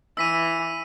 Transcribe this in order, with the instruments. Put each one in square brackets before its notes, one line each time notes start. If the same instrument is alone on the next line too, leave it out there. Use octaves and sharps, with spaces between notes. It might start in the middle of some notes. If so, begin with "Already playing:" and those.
[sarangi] E3 [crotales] E6 B6 D#7